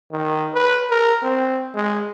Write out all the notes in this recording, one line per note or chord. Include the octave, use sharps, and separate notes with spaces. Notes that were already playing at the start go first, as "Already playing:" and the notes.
D#3
B4
A#4
C4
G#3